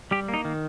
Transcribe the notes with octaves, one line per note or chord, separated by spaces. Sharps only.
G3 G4
A#3
D#4
D#3